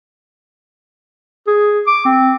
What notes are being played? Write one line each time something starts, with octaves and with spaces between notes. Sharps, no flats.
G#4
D6
C4